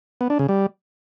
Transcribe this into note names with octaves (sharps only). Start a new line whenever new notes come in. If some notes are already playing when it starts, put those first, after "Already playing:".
B3
D4
C#3
G3